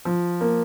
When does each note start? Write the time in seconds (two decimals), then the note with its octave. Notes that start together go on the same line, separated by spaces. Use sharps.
0.05 F3
0.41 A#3